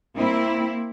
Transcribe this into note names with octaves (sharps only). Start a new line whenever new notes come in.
A#3 C4 E4